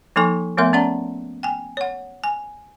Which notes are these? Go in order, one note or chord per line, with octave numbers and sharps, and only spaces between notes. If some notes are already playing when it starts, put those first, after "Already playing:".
F3 A#3 D#4 A4 G#5 C#6
F3 A3 B3 A#4 E5 C6
C#4 D5 F#5 A#5
G5 G#5
C#5 F#5
G#5